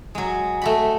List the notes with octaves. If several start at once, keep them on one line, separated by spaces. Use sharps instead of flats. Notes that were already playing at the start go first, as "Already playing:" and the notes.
F#3 G#3
A3 F#4 B5